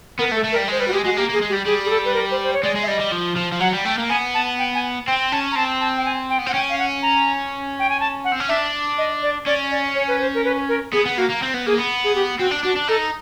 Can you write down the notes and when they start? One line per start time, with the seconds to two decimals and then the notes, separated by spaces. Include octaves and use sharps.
0.19 B3 A#4
0.32 A3
0.36 A4
0.44 A3
0.52 A#4
0.56 G3
0.68 G#3 C5
0.80 G3 B4
0.88 F#4
0.93 G#3 G4
1.05 G#3 F#4
1.17 A#3 G4
1.30 A#3 G#4
1.42 G#3
1.49 G4
1.53 G3
1.66 G3 G#4
1.85 G#4
1.90 A4
2.05 B4
2.14 A#4
2.31 C5
2.44 C5
2.53 C#5
2.63 G#3 D5
2.76 G#3
2.83 E5
2.88 G3 D#5
3.00 G3
3.12 F3
3.37 F3
3.52 F3
3.60 F#3 F#5
3.73 G3
3.85 A3 G5
3.98 A#3
4.09 B3 G#5
4.34 A5
4.59 G5
4.75 G#5
5.07 C4 G5
5.32 C#4 A5
5.52 A#5
5.56 C4 A5
5.81 A5
5.98 G5
6.05 G#5
6.30 G5
6.39 B3
6.46 C4 F#5
6.54 C#4 G5
6.69 F5
6.79 F#5
7.02 A#5
7.79 G5
7.90 G#5
8.00 A5
8.24 F#5
8.32 C4
8.40 C#4
8.49 D4 E5
8.98 D#5
9.23 D5
9.46 C#4 D5
9.71 D5
9.95 C#5
10.08 B4
10.20 C5
10.34 A#4
10.44 B4
10.69 A#4
10.93 B3 G#4
11.06 B3
11.17 A#3 F#4
11.29 A#3
11.42 C4
11.54 B3
11.66 A#3 G#4
11.78 B3
12.04 G#4
12.15 G4
12.39 C4 F#4
12.51 D4
12.64 D4 F#4
12.76 D4
12.88 D#4 A4